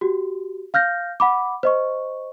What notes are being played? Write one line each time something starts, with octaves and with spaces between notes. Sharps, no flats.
F#4 G4
F5 F6 G6 A#6
F#5 B5 D6
C5 D#5 C#6